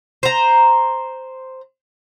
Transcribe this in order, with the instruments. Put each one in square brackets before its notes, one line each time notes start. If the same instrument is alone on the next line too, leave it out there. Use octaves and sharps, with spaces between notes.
[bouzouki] C5 A#5